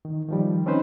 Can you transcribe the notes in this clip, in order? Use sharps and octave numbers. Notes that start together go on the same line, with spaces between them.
D#3
D#3 F3 G3
C4 C#4 D#4 B4 C5